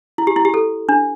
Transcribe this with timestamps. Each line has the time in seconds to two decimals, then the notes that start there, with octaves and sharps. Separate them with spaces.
0.18 E4
0.27 G4
0.36 E4
0.45 G4
0.54 A4
0.89 D4